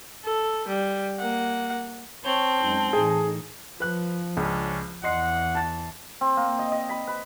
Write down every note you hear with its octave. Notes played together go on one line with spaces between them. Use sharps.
A4
G3
A#3 F#5
C4 C#5 A5 G6
F#2 G#3 D#4
A2 E3 D#4 G#4
F3 B4 F#6
C#2 C#4 D4
E2 D#5 F#5 C6 C7
A5 A6
C4
A#3
D#5
D#5
B5
B4